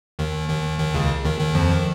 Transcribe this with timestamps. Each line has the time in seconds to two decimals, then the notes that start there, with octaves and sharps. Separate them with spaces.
0.19 D#2 D#3
0.49 D#2 D#3
0.79 D#2 D#3
0.94 C#2 C#3
1.24 D#2 D#3
1.40 D#2 D#3
1.55 F2 F3
1.71 D#3